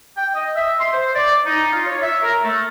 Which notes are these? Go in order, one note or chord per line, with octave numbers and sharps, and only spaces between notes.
G5
D#5
E5
C6
C5
D5
D#4
F4
C#5
E5
A#4
A3